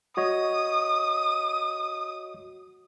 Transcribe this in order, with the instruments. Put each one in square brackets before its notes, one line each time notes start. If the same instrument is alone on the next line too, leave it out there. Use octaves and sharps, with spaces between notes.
[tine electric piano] F#4 C#5 D#5 [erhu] D#6